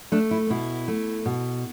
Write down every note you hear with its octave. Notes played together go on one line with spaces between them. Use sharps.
A3 D4
E4
B2 E4
A3
B2